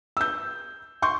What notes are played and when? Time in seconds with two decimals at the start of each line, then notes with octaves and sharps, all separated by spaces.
0.17 E6 G6
1.02 C6 C#6 G6